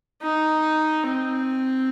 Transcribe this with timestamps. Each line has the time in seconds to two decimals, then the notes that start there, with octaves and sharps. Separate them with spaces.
0.22 D#4
1.03 C4